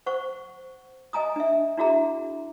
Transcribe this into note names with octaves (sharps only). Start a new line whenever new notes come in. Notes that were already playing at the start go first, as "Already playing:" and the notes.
C5 F#5 C#6
D#5 G#5 A#5 D#6
D4 E5
D4 E4 F#4 G#4 E5 A#5